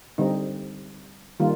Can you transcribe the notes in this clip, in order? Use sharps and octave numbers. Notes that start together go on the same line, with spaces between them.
D3 G3 C4 D#4
D#3 G3 A#3 F4